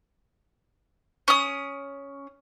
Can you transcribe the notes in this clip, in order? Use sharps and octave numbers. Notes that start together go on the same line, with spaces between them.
C#4 D#6